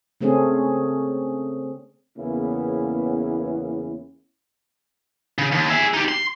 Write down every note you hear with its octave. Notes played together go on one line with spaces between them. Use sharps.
C#3 A3 C4 C#4 G#4
E2 C#3 A#3 B3 C#4 E4
C#3
D#2
G#4 E5
D#4 G4
C6